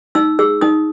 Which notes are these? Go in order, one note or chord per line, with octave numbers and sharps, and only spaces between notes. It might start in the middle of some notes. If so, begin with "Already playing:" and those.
D#4 E6
G#4 E6
D#4 D#6